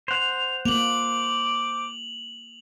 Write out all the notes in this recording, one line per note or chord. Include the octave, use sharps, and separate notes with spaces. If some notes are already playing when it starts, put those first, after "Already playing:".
C5 F#5 F7
A#3 D6 F7 F#7